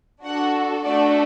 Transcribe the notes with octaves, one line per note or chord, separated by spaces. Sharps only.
D4 F#4 A4 F#5
A3 D4 F#4 A4 D5